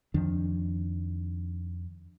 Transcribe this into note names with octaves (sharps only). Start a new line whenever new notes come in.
F2 D#3 F3 D4